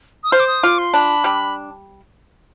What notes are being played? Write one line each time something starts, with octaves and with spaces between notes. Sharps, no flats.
D#6
C5 F6
D6
D#6
F4 D6
C6
D4 B5
G3